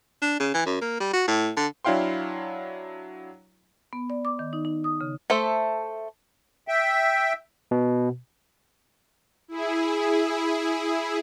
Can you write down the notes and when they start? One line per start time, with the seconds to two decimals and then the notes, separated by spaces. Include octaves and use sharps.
0.22 D4
0.40 C#3
0.54 E3
0.66 F#2
0.81 A#3
1.00 G3
1.13 F#4
1.28 A2
1.57 D3
1.85 F#3 D4 E4 F5 G5 C6
3.93 B3
4.10 D5
4.25 D6
4.39 D#3
4.53 D#4
4.65 D#4
4.84 D#6
5.01 C#3
5.30 A3 A4 C5 E5
6.68 E5 G5
7.71 B2
9.48 E4 G#4